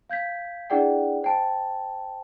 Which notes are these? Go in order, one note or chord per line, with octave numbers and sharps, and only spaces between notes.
F5 G6 G#6 B6
D4 E4 G#4 D5 F#5 G5
C5 G5 A5